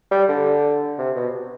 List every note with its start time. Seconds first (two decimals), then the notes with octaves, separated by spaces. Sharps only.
0.11 G3
0.29 D3
0.98 C3
1.16 B2